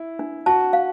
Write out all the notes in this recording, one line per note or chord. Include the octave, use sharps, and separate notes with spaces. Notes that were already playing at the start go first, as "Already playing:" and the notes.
Already playing: E4
D4
F#4 A5
F5